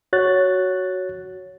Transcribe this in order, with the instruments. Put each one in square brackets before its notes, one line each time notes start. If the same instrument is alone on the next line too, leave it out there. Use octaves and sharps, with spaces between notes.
[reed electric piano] F#4 C#5 F#6 A6